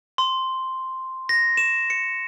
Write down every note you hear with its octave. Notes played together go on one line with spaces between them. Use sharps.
C6
A#6
E7
C#7